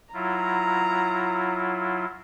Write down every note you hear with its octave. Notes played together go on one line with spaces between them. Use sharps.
F#3 E4 F4 A#5